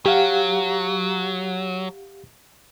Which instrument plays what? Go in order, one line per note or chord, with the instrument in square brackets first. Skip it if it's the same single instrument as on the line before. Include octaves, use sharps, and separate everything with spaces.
[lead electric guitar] F#3 [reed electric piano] G4 F5 F#5